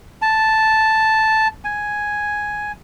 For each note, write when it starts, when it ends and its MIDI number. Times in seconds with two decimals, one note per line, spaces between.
0.22 1.48 81
1.65 2.72 80